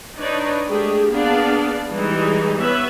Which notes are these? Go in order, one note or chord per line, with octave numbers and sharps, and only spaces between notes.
D4 D#4 B4 C#5 D5
G#3 A3 D4 G4 G#4
A#3 B3 D4 G#4 D5 F5
E3 G3 G#3 D#4
B3 C#4 B4 E5